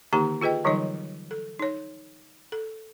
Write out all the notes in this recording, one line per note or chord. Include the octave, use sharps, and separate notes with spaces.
D3 D#3 A#3 D#4 G4 A#5
F4 G#4 B4 D#5 G5
D3 E3 F#3 G3 D#4 C#5
A4
D#4 C#5
A4